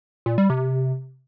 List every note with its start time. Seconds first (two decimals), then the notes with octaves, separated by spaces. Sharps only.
0.26 A#2
0.38 G3
0.50 C3